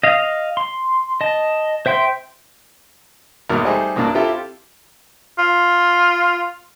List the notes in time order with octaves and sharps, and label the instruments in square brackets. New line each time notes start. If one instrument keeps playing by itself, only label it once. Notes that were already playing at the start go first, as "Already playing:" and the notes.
[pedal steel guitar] D#5 F5
C6
D#5 A5
C5 E5 G5 C6
[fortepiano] G#1 E2 B2 A#3 D6 F6
G3 A3 D#4 G#4 C5 D#5
B1 F#2 A#2 A#3 D4 A5
C4 E4 F4 G4 A4
[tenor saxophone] F4